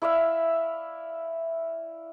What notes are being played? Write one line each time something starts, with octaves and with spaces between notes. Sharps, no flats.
E4 D5 E5 F5